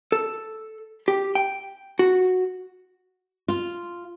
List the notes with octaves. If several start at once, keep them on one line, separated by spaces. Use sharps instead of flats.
A4
G4
G5
F#4
F4